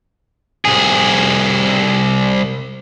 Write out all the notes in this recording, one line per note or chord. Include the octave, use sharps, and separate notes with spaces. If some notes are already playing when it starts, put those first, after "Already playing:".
C2 G#4